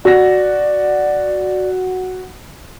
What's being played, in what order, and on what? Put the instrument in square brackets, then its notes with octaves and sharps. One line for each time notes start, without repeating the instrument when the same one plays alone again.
[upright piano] F#4 A#6 [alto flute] D5